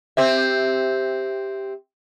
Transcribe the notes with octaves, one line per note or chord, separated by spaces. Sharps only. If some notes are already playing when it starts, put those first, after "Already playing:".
C4 G4 E5